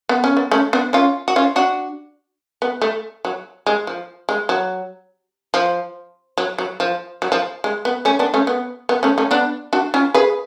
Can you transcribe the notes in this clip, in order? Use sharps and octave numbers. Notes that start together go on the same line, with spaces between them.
B3
C#4
B3
A3 C#4
B3 D4
C#4 F4
F#4
C#4 F4
D4 F#4
B3
A3
F#3
G#3
F3
G#3
F#3
F3
F#3
F#3
F3
F#3
F3
G#3
B3
A3 C#4
B3 D4
A3 C#4
B3
B3
A3 C#4
A3 C#4
B3 D4
D4 F#4
C#4 F4
G#4 B4